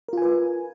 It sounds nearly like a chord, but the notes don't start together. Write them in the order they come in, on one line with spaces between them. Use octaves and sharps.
A#4 F4 G#5 B4